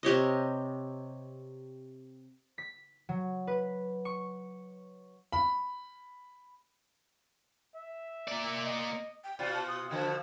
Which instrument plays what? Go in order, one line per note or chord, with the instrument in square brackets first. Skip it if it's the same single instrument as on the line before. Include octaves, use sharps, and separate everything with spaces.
[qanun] C3 G4 C#5 D#5
[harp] B6
F#3
B4
C#6
[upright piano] B5
[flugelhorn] E5
[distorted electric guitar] A#3 D5
[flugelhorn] D#5
[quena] G5
[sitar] B2 F4 F#4 [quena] D5
[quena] A5
D#6
[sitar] B2 D3 F3 [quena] F#4